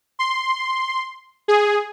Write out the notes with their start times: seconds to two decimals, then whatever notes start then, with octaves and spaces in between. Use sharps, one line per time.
0.19 C6
1.48 G#4